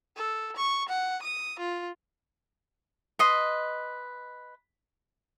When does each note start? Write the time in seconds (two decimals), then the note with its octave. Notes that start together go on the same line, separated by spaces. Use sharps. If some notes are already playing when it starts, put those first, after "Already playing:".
0.16 A4
0.56 C#6
0.89 F#5
1.22 D#6
1.59 F4
3.19 B4 D#5 C6